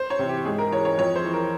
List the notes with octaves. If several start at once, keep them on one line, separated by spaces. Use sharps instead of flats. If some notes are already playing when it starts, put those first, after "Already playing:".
Already playing: C5
C#5
C3 E3
G4
G#2 G#4
A#4
E3 C#5
C#5
F2 C#5
C5
E3
A#4